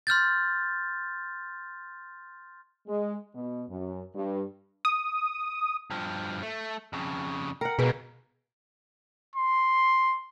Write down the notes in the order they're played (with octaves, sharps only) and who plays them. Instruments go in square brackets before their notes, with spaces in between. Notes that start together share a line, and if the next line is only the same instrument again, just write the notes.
[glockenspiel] C6 F6 G6 A6
[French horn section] G#3
B2
F#2
G2
[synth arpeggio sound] D#6
[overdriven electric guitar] G2 F3
A3
F2 C#3
[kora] A#4 F#5 [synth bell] G5
[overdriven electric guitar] G#2 A#3 [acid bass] B2 [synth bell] G#4 B4
[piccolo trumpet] C6